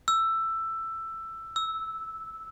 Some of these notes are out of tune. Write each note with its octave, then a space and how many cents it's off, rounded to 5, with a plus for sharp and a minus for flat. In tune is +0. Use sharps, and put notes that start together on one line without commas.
E6 +10
E6 -10